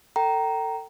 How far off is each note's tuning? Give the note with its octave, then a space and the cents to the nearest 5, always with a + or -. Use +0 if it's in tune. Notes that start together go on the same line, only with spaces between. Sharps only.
A4 +30 G5 -25 A#5 +0